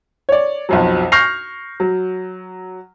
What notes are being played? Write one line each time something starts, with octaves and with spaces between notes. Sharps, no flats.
C#5 D5
B1 F2 F#3
C#6 F6 G6 A#6 C7 F7
F#3